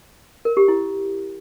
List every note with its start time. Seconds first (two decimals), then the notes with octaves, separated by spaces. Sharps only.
0.45 A#4
0.57 G4
0.68 E4